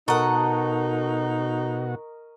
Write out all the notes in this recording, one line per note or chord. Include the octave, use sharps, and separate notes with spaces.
B2 D#4 F#4 A4 A#4 D#5 F#5 C#6